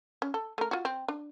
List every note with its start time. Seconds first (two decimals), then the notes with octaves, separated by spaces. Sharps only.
0.22 C#4
0.34 A4
0.58 A3 A#4
0.71 F4 F#4
0.85 C4
1.08 D4